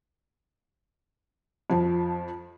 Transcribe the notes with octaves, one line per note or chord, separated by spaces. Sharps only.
F2 F3